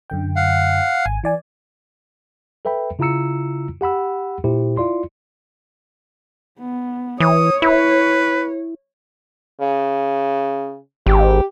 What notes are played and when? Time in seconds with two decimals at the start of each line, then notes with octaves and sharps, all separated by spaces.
0.10 F#2 D3 G5
0.36 F5 F#5
1.06 G#1 G#5
1.24 E3 D5 G#5
2.65 A4 B4 E5 G5 B5
2.99 C#3 E4 F4 A#5 E6 C#7
3.81 G4 F#5 B5 E6
4.44 A#2 E4 G4 C5
4.77 E4 F4 D5 C6
6.59 B3
7.20 E3 C#5 D#6
7.62 E4 B4
9.61 C#3
11.06 G#1 G4